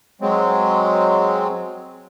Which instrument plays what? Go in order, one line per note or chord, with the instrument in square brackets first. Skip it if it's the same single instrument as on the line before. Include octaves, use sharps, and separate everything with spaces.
[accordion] F#3 G#3 C4